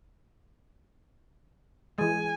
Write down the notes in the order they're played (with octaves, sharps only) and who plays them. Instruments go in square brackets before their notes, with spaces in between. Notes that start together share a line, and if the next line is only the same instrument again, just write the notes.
[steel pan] E3 G#3 [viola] G#5